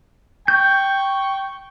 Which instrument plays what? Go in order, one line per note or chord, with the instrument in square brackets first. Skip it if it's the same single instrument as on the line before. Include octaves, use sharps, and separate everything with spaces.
[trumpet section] G5 C#6 [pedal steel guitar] G6